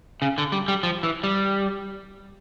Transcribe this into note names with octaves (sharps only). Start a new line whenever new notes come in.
C#3
D3
G3
G3
F3
E3
G3